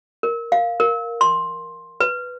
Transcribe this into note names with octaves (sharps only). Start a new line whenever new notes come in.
A#4
F5
A#4
C6
B4